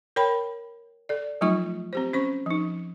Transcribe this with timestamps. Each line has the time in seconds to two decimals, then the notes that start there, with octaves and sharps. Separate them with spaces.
0.16 A#4 C#5 G5 B5
1.09 A4 D5
1.41 F3 F#3 A3 D#4 F4 C#6
1.93 C4 G4 C5
2.13 C#4 C5 C#6
2.46 F3 D#4